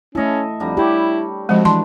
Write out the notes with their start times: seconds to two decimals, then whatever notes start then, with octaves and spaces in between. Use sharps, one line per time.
0.15 A3 C#4 E4 A4 D#5 E5
0.60 F2 D3 G3 A#5
0.77 E4 G4 C#5 G5 B5
1.49 F3 G#3 A3 C4 F#4
1.65 E3 D4 A5 C6